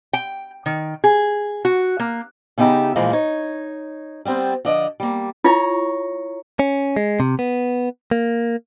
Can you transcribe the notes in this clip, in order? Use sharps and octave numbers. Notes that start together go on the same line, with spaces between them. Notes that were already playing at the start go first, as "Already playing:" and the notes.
G5
D#3
G#4
F#4
A#3
C#3 B3 D#4 G4 E5 A#5
A#2 E3 F3 G#3 A#3
D#4 C#5
G3 B3 C4 C5
D3 F3 D5 D#5
G3 A#3
E4 F4 C#5 A#5
C#4
G#3
C3
B3
A#3